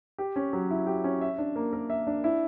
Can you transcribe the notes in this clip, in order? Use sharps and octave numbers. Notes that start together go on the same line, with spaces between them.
G4
C#4
F#3
E4
G4
C#4
E5
D4
A#3
A#4
E5
D4
E4